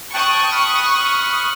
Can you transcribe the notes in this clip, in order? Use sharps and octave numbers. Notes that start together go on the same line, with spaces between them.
G5 A5 C#6 D#6 F#6
B5 F6 F#6